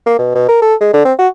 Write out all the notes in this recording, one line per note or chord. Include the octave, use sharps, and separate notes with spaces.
A#3
B2
B2
A#4
A4
G#3
D3
C4
F#4